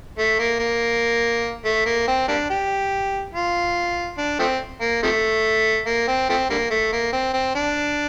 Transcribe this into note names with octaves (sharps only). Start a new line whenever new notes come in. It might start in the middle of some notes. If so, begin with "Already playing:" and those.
A3
A#3
A#3
A3
A#3
C4
G3 A#3 D4
G4
F4
D4
F3 A3 C4
A#3
C3 F3 A3
A#3
C4
F3 A3 C4
D3 G3 A#3
A3
A#3
C4
C4
D4